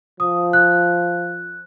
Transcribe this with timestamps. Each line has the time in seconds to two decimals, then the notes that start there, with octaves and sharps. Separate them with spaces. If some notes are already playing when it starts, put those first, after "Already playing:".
0.20 F3 D#6
0.53 F#6